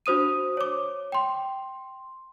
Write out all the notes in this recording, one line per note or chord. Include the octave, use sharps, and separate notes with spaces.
D4 F#4 C5 D#6 D#7
C#5 D6
G5 C6